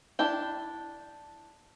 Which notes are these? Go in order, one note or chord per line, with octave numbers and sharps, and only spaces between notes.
D4 E4 G5